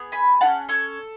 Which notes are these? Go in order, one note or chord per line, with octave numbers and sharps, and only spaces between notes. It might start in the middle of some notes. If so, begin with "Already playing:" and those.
Already playing: B3 G#4
G#5 B5
C#4 E4 G#4 F#5 A5
A4 C#5